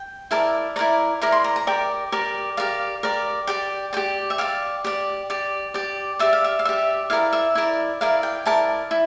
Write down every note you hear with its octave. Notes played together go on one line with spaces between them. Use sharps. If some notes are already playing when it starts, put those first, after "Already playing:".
Already playing: G5
E4 A#4 D5 A5
E4 A#4 D5 A#5
E4 A#4 D5 A#5
C6
A#5
A#5
G4 A#4 D5 G5
G4 A#4 D5
G4 A#4 D5 F5
G4 A#4 D5
G4 D5 G5
G4 D5 G5
E5
G4 D5 F5
G4 D5
G4 D5
G4 D5
G4 D5 E5
F5
E5
F5
G4 D5 E5
E4 A#4 D5 F5
E5
E4 A#4 D5
E4 A#4 D5 F5
G5
E4 A#4 D5 A5
E4